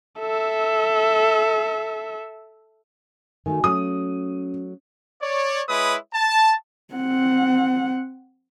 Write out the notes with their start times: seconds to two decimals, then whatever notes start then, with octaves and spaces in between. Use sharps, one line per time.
0.20 A4 E5
3.46 D#3 A3 D#4 F#4 G#5
3.64 F#3 A3 C#4 D#6
5.22 C#5 D5
5.69 G#3 E4 B4 C#5 D#6
6.14 A5
6.94 C4 F#5